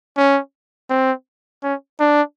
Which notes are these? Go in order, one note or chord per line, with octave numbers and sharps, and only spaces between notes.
C#4
C4
C#4
D4